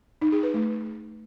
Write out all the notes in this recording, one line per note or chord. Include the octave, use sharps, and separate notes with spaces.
D#4
G#4
B4
A3